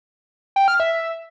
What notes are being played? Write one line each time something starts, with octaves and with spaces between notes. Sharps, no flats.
G5
F6
E5